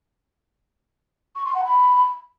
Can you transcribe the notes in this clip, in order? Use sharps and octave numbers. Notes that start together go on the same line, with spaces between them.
C#6
C6
F#5
B5